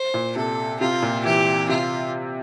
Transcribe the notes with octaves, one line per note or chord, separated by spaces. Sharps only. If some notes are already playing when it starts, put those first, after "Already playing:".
Already playing: C5
A#2
C3 A4
C3 F4
A#2
E3 G4
C3 F4